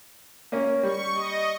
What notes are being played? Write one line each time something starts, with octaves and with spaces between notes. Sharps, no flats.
A#3 C#4
G3 C#6
D#5